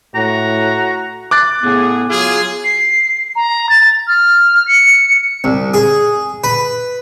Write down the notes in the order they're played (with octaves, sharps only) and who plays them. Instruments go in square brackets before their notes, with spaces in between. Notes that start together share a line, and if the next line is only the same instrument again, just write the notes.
[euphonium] A2 [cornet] F#4 [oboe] A#5
[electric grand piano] D6 F#6 A6
[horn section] A2 C#3 G#4 [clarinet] B3
[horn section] F#3 F4 G#4
[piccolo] C7
A#5
A6
F6
C#7
[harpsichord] C2
G#4
B4